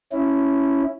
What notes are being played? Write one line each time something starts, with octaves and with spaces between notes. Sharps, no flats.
C#4 E4